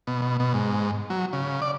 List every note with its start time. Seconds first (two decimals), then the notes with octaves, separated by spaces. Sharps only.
0.07 B2
0.22 B2
0.40 B2
0.54 G#2
1.10 F#3
1.33 C#3
1.62 D5